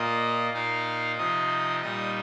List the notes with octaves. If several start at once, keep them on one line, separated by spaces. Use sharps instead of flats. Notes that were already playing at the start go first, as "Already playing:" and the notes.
Already playing: A#2 A#3 F4 D#5
A#2 A#3 D#4 F5
C3 F3 C4 D#4 D#5
A#2 G3 D#4 D#5